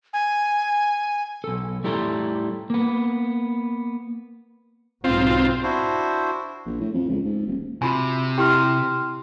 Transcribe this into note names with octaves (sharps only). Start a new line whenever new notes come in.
G#5
B1 A4
A2 G3 E4 A4 A#5 C6
A#3 B3
B1 G#2 C4 F4
D4 E4 F#4 C5
A#1
A2
F2
C#2
G#2
D#1
C3 F4 F#4 G#5
E4 G4 G5 C6 F6